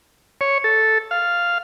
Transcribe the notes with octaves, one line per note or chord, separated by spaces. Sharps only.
C#5
A4
F5